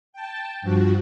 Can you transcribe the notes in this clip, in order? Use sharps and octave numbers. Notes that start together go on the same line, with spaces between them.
G5 A5
G2 F3 F#4